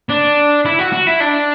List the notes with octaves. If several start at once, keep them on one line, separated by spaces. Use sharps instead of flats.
D4
E4
F#4
F#4
E4
D4